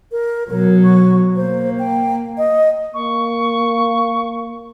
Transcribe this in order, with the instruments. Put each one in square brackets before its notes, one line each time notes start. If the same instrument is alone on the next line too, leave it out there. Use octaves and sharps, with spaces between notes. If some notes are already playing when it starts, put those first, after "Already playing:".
[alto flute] A#4
[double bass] B2 F#3 [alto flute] A#4
[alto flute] C#6
[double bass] A#3 [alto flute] C5
[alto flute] G5
D#5
[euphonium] A#3 [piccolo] C#6